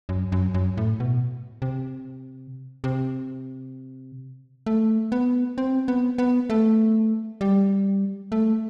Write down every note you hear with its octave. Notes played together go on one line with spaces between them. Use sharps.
F#2
F#2
F#2
A2
B2
C3
C3
A3
B3
C4
B3
B3
A3
G3
A3